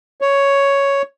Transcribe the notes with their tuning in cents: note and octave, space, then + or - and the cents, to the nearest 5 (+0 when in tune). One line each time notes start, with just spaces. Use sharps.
C#5 +5